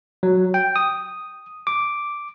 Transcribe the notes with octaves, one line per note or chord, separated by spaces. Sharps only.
F#3
G5
D#6
D6